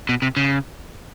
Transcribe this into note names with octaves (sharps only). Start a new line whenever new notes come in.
B2
C3
C#3